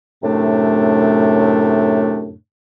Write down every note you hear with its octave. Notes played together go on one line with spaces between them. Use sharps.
F#2 A2 C3 A3 D4